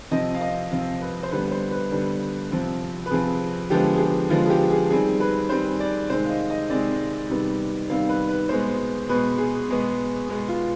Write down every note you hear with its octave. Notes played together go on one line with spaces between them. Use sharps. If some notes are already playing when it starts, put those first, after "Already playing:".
C3 F3 C4 D#5
F5
D#5
C3 F3 C4 F5
B4
C5
D3 G3 B3 B4
C5
B4
D3 G3 B3
C3 F3 C4
B4
C3 F3 C4 G#4
D3 F3 G#3 B3 G4
G#4
G4
D3 F3 G#3 B3 F4
G#4
G4
G#4
D#3 G3 C4 G#4
B4
D#3 G3 C4 C5
D5
C3 D#3 G#3 C4 C5
F5
D#5
D#5
C3 D#3 G#3 C4 D5
C3 D#3 G3 B3
C3 D#3 G3 B3 F5
B4
B4
B2 G#3 B3 C5
B2 G#3 B3 B4
G#4
B2 G#3 B3
B2 G#3 B3
F4